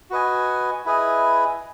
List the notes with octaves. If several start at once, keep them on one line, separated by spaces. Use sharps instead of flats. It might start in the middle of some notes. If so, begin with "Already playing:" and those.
F#4 B4 D#5 G#5
E4 G#4 B4 D#5 G#5